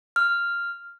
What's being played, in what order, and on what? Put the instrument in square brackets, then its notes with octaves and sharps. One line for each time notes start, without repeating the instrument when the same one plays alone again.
[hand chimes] F6